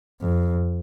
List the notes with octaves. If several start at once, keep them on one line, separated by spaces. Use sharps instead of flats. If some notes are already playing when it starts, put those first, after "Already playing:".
F2